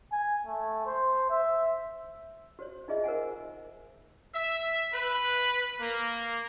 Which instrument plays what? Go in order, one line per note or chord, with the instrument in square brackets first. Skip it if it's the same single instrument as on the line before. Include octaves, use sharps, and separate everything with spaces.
[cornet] G#5
A3
C5
E5
[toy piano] F#4 C5 C#5
D#4 F4 G#4 D#5 E5
A#4 C5 D#5 F#5 G#5
[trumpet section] E5
B4
A#3